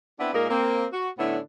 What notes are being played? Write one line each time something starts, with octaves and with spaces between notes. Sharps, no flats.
B3 C4 D4 E4 B4
A#2 G#3 A#3 D#4 A#4
A#3 C4
F#4
A2 D3 B3 C#4 D4 E4